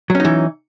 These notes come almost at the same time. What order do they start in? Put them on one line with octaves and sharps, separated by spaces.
F#3 C#4 D#4 E3